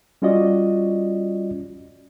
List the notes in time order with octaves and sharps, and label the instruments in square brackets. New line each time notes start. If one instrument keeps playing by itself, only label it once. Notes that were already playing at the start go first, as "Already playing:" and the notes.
[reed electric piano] G3 C#4 F4 F#4 D5 D#5